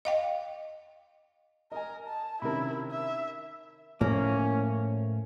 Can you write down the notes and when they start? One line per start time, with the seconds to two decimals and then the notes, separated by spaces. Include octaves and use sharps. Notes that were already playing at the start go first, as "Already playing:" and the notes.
0.05 D#5 F5 G5
1.72 A#4 D#5 G#5
2.07 A5
2.42 C3 D#3 C#4 E4 A#4 B5
2.91 E5
4.01 A2 F3 A3 A#3 C#4